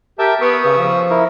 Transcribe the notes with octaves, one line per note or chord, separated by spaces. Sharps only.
G4 A#4 E5 A5
B3 C#6 D#6 E6
C#3
F3
E4 A#4